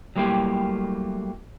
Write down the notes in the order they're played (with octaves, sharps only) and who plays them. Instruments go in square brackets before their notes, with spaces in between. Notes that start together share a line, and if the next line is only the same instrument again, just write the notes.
[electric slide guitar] F#3 G3 A3 A#3 E4 G4